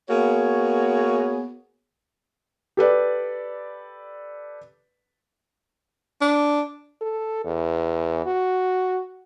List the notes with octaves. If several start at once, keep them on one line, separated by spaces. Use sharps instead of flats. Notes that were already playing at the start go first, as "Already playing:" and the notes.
A#3 B3 F#4 G#4 C#5
G4 A4 B4 D5
D4
A4
E2
F#4